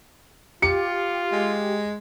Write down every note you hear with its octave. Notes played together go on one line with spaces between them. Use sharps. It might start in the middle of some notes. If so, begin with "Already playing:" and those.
F4 G4 C#7
G#3